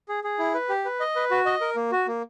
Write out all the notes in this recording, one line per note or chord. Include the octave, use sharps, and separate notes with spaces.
G#4
G#4
E4
B4
G4
B4
D#5
B4
F#4
D#5
A#4
A#3
F#4
A#3